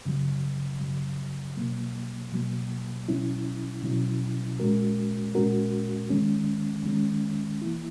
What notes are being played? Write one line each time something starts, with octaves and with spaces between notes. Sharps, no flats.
F#2 C#3 F#3
F#2 C#3 F#3
B2 F#3 A#3
B2 F#3 A#3
B2 F#3 C#4 E4
B2 F#3 C#4 E4
A#2 G#3 C#4 F#4 A#4
A#2 G#3 C#4 F#4 A#4
D#3 G#3 C#4
D#3 G#3 C#4
E3 A#3 E4